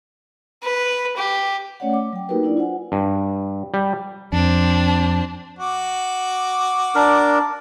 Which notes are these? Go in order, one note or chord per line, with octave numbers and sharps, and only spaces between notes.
B4
G4
A3 C#4 C#5 D5 F#5
D6
F#3 G5
A#3 D#4 F#4 G4 A#4 B4
D4 E4 D5
F4 C5 F#5 G#5
G2
G3
F2 C4 D4
F#4 D6
D4 A#4